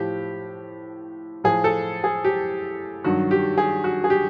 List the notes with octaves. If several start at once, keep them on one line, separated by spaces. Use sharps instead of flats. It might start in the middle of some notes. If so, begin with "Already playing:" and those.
Already playing: A2 F3 G4
A2 F3 G#4
A4
G#4
G4
G2 D#3 F#3 F#4
G4
G#4
F#4
G#4
G4